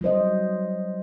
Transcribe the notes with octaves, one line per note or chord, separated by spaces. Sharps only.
F#3 G3 C5 D#5